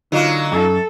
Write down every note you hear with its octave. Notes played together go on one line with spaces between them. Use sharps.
D3 F#3 A#3 D#4 F4 D#5
F#2 A4